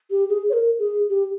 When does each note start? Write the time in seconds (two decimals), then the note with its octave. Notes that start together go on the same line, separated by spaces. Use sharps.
0.10 G4
0.29 G#4
0.49 C#5
0.53 A#4
0.79 G#4
1.09 G4